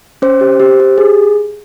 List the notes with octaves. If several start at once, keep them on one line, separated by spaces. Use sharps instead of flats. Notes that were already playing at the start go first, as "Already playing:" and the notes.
C#4 C5
G4
G4
G4
G#4